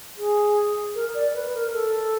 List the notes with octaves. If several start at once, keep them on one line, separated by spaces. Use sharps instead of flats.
G#4
A#4
D5
B4
A#4
A4